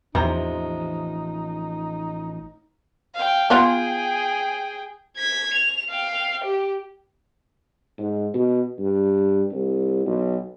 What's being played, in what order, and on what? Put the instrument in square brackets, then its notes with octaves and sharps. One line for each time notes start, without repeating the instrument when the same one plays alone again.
[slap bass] A1 F3 [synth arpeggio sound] E2 [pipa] C3 A#5 [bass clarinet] D#4
[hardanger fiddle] F5 G5
[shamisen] B3 F4 [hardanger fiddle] G#4 G5
[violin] G#6 B6
F7
F5 G5
G4
[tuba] G#2
B2
G2
C2
B1